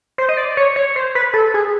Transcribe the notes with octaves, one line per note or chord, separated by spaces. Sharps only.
C5
D#5
D5
C#5
C#5
C5
B4
A4
G#4